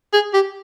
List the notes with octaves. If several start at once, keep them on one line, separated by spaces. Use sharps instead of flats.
G#4
G4